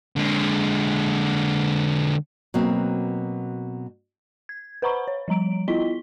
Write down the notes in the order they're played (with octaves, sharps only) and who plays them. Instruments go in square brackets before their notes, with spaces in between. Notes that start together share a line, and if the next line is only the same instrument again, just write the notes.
[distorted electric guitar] D3 G#3
[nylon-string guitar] B2 F#3 A#3 C4
[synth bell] G#6
B4 C5 F#5 A#5 B5 C#6
C#5
F3 G3 A#5 D7
B3 E4 F4 D#5 B6 G7